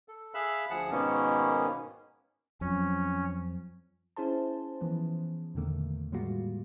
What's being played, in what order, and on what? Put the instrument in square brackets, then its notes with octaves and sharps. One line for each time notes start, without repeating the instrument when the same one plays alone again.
[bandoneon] A4
G#4 E5 F5 B5 E6 F#6
D2 F3 G#4 F#5 A5
G#2 B2 D#3 A#3 B3 C#4
[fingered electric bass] F2 F3 [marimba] F#3 [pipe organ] C#4
[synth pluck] C#4 E4 G#4 C5 A5
E3 F3 B3
E2 A#2 D3 D#3 A3 A#3
A2 G3 G#3 A#3 F4 F#4